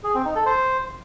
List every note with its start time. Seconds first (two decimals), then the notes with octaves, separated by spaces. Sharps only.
0.04 G#4
0.14 C4
0.25 D#4
0.35 A4
0.46 C5